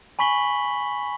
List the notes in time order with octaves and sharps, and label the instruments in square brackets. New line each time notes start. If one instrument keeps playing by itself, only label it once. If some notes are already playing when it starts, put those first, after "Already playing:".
[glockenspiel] G#5 B5 C#6 B6 F#7 G7